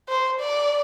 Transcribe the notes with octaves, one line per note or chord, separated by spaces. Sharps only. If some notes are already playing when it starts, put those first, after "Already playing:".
C5
D5